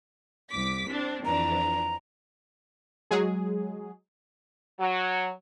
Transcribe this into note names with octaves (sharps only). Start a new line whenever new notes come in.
C2 D6 B6
C4 D4
F2 E3 D4 A#5
F#3 G#3 G#4
F#3